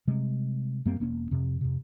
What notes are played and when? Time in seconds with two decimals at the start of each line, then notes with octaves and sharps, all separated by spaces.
0.08 C3 G3 G#3
0.85 F#2 G3 A#3 C4
1.00 E1 A#3 C#4
1.31 F2 C3
1.61 F2 C3